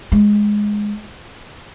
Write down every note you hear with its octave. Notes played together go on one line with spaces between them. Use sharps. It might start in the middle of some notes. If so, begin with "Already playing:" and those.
G#3